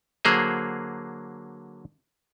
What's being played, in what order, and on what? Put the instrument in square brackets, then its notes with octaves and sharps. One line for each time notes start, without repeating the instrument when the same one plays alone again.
[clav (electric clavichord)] D3 F#3 A#3 G#4 C5